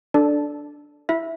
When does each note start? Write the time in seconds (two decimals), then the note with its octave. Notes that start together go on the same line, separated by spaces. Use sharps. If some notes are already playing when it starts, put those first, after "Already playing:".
0.14 D4 A4 D5
1.09 E4 E5